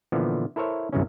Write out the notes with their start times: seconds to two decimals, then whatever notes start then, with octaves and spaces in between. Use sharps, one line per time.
0.12 A#2 D3 E3 F3 B3
0.56 E4 A4 A#4 C5 C#5 E5
0.93 G1 C2 F#2 C#3 E3 C#4